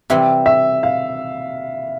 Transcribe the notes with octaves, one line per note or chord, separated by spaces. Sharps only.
C3 E3 G3 C4 E5
E5
F5